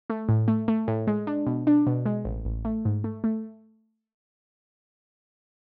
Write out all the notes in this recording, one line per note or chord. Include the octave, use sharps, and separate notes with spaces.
A3
A2
A3
A3
A2
G#3
D4
B2
D4
B2
G#3
A1
A1
A3
G#2
A3
A3